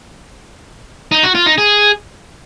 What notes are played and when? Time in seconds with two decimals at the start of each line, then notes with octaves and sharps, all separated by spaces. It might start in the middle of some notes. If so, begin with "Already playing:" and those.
1.12 D#4
1.23 F#4
1.35 F4
1.46 D#4
1.58 G#4